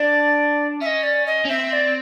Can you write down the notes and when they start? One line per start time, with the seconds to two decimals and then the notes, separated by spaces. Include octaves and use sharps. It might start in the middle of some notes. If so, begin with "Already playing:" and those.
Already playing: D4 D5
0.81 C#4 E5
0.86 D#5
1.03 D5
1.26 D#5
1.45 C#4
1.49 C4 E5
1.73 D5